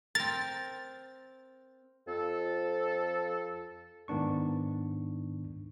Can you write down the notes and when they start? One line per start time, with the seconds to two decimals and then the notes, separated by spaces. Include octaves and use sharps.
0.15 C4 A#4 A6
2.08 F2 A4
4.08 G#2 D#3 B3 D4 C#6